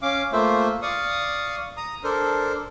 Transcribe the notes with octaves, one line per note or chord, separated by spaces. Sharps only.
C#4 F5 D6
A3 A#3 F4 C5 E5
D5 F5 C#6 D#6
A#5 D#6
D4 A4 A#4 C5